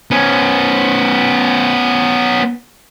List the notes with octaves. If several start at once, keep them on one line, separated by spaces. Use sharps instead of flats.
B3 C#4